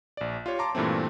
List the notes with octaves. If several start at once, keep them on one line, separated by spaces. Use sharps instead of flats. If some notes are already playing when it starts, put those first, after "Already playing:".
A#1 D5
F4 G4 C#5
A5 A#5 C6 D6
G2 A#2 E3 A3 C4